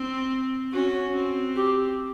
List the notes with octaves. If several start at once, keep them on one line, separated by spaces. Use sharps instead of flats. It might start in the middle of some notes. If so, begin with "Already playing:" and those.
Already playing: C4
C#4 F#4
C4
G4